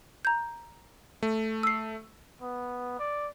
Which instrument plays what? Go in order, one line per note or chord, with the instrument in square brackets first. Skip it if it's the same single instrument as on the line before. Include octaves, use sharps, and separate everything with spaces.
[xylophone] A#5 G6
[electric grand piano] A3
[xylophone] E6 C7
[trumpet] B3
D5